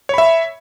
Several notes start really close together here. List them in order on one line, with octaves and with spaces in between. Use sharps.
C#5 B5 E5